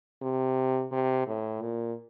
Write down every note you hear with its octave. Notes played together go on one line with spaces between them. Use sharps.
C3
C3
A2
A#2